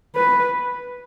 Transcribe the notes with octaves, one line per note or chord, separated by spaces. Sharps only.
B4